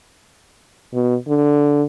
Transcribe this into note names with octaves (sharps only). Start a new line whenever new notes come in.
B2
D3